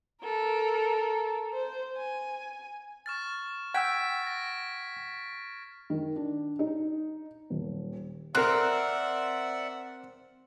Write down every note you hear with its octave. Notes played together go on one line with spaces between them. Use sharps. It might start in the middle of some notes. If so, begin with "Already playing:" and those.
A4 A#4
C5
G#5
C#6 F6 A6
F#5 G5 E6 G#6 B6 D7
A6 A#6
D#3
D4
D#4
D#1
C4 A#4 D5 E5 F#5 F#6